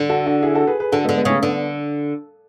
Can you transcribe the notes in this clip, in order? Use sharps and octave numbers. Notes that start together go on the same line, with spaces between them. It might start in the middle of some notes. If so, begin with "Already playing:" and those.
Already playing: D3
F#4 A4
D4 F#4
E4 G#4
F#4 A4
G#4 B4
G#4 B4
D3 F#4 A4
G#3 B3
D3
G#3 B3
C#3 A3 C#4
D3 B3 D4